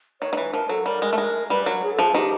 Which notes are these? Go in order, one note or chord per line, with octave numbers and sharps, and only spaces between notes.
D#3 C#5
D#3
E3 B4
F3 A#4
F#3 A4
G3 A#4
G#3
A3
G#3
G3 B4
F#3 A#4
G#4
A4
F3
G#4
D#3 G4